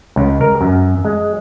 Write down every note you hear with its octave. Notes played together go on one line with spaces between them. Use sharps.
C#2
A#4
F#2
G#3